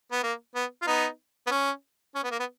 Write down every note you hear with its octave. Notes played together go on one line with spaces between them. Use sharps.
B3
A#3
B3
F4
B3 D#4
B3
C#4
C#4
B3
A#3
B3